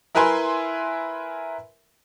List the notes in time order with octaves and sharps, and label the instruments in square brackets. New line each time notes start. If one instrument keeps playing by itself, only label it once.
[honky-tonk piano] E4 A#4 B4 E5 G#5 C6